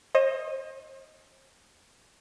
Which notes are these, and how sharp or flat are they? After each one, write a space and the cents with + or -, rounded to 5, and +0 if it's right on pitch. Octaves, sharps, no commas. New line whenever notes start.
C5 +40 D#5 +0